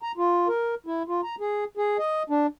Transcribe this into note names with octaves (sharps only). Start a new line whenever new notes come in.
A#5
F4
A#4
E4
F4
A#5
G#4
G#4
D#5
D4